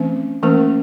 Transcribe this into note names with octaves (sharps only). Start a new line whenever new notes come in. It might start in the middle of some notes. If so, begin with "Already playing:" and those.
Already playing: E3 A3 C4 C#4
E3 A3 A#3 C#4 A#4